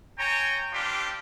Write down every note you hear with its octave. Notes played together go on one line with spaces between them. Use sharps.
C#5 G5 G#5 A#5
G3 C4 D4 F4 G4